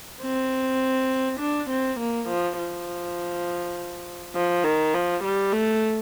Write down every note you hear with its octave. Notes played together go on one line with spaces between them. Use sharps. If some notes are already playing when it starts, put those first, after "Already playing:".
C4
D4
C4
A#3
F3
F3
F3
D#3
F3
G3
A3